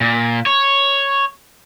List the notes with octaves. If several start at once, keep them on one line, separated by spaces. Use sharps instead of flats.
A#2
C#5